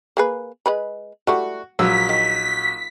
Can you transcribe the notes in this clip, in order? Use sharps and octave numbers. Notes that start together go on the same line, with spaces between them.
A#3 G#4 B4
G#3 B4 B5
G3 A3 E4 F#4
A#1 F#3 A#3 E6 B6
D#3